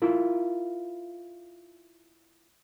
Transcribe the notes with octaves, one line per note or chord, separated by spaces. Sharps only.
E4 F4 A#4